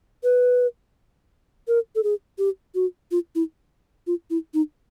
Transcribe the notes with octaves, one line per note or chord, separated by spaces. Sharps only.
B4
A#4
A4
G#4
G4
F#4
F4
E4
F4
E4
D#4